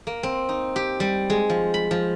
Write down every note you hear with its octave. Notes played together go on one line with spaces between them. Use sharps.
A#3
C4
D#4
G4
G3
G#3
F3
B5
F3